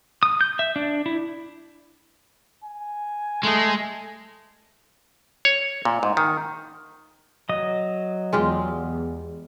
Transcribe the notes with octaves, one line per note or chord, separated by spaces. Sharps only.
D#6
G6
E5
D4
E4
G#5
G#3 A3 G#4
C#5
A#2
G#2
D#3
F#3 D#5 D#6
E2 E3 G#3 F4 G4